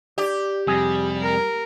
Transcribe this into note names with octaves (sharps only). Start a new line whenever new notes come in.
G4 D5
F2 C3 G3 G#4
A#4